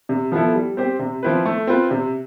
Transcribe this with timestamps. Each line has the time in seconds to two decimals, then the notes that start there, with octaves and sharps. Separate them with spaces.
0.09 C3
0.32 F3 B3 E4 A4
0.55 G3
0.77 C4 G4 C5
0.99 C3
1.23 F3 C4 E4 B4
1.45 A3
1.67 C4 F4 B4
1.91 C3